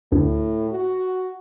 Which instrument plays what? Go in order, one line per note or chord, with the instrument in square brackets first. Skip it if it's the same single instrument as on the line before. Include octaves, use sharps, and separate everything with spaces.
[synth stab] D2 [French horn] A2
[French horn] F#4